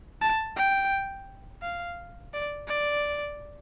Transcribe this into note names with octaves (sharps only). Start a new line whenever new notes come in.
A5
G5
F5
D5
D5